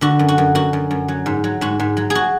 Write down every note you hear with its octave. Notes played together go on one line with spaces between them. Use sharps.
D3 F#4
F#2
F#4
F#2
F#2 F#4
F#2
F#2
F#3
G#2
F#3
G#2 F#4
G#2
F#3
G#4
F#4